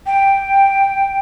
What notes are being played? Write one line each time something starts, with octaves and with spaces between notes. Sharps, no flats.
G5